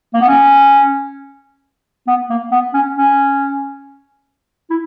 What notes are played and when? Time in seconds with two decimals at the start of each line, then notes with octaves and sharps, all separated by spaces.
0.14 A#3
0.21 B3
0.28 C#4
2.07 B3
2.30 A#3
2.52 B3
2.74 C#4
2.97 C#4
4.70 E4